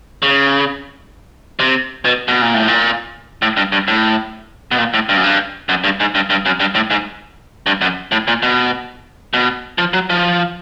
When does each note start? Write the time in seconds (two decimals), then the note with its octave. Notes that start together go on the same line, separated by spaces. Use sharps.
0.23 C#3
1.60 C3
2.05 B2
2.28 B2
2.42 A#2
2.54 A2
2.68 A#2
3.42 A2
3.57 G2
3.72 G2
3.88 A2
4.71 B2
4.78 A#2
4.94 A2
5.09 G2
5.17 F#2
5.24 G2
5.69 F#2
5.84 G2
6.00 G#2
6.15 G2
6.30 G2
6.46 F#2
6.60 G2
6.75 A2
6.90 G#2
7.66 G2
7.81 F#2
8.12 A2
8.28 A#2
8.43 B2
9.34 B2
9.78 F3
9.93 F#3
10.10 F3